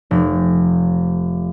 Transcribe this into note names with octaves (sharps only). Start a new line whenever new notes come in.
F1